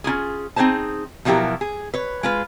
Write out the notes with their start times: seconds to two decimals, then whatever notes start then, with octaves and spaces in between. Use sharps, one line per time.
0.04 C#4 E4 F4 G#4
0.56 C4 D#4 G#4 C5 A5
1.25 B2 F3 F#3 E4 G4 A#4
1.61 G#4
1.94 B4 C#5
2.23 G#3 F4 B4